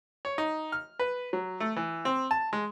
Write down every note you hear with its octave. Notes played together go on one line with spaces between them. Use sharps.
C#5
D#4
F6
B4
F#3
A3
E3
C4
A5
G#3